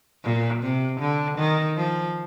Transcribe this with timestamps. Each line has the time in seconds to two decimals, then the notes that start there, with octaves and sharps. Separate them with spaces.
0.24 A#2
0.62 C3
1.00 D3
1.38 D#3
1.77 F3